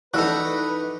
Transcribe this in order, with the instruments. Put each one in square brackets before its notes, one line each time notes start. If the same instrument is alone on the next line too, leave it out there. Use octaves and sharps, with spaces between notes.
[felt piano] E3 D5 [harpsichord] D#4 F#4 [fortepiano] A4 E6 F#6 [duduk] B4